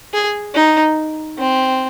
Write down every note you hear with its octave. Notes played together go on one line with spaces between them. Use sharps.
G#4
D#4
C4